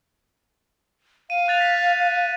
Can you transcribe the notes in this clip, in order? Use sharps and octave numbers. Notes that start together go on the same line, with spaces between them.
F5 D#7
F#6 A6 F7
B6